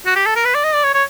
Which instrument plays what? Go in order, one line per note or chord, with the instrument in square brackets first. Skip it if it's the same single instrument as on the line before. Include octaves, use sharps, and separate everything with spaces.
[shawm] F#4
G4
A4
A#4
B4
D5
D#5
D5
C#5
C#5